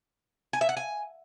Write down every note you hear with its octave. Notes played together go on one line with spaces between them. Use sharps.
G#5
E5
F#5
G#5